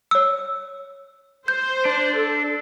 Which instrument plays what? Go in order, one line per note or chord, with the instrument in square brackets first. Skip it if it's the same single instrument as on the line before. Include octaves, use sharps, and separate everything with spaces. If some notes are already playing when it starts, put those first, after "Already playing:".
[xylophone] C#5 E6
[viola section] C5 [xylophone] G6
[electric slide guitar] D4
[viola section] A4